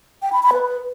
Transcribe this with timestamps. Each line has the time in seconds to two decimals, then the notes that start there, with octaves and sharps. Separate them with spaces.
0.22 G5
0.33 B5
0.43 B5
0.53 B4